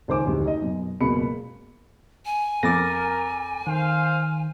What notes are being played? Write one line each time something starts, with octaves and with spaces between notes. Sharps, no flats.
C#2 D#3 C5 G#5 D6
F1 D2 G#2
D#4 D#5
F#2 B2
F#1 C#2 B2 B5 C#7
G#5
F2 A#4 D6 A6 A#6
D#3 C5 F5